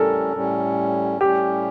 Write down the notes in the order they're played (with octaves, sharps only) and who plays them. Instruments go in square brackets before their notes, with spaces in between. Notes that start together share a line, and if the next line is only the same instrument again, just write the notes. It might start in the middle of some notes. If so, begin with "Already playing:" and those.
Already playing: [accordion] A2 G3 C#4 [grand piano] A4 A#4
[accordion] A2 G3 C#4
[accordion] A2 G3 C#4 [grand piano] G4